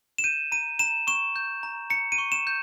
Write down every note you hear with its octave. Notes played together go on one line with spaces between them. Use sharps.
E7
G6 D#7
A#5 D#7
A#5 E7
C#6 E7
G6
A#5
A#5 C#7
D#7
C#6
E7
G6